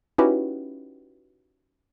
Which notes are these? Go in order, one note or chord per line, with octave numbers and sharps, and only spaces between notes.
C#4 D#4 E4 F#4 G4 B4